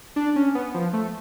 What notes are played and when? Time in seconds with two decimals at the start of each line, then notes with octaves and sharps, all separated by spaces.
0.16 D4
0.36 C#4
0.55 B3
0.74 F3
0.93 A3